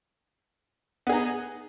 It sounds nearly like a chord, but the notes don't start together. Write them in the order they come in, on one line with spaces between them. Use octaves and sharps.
B3 G#4 D#4